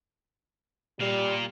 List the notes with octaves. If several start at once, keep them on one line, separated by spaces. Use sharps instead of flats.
A#2 G3 F5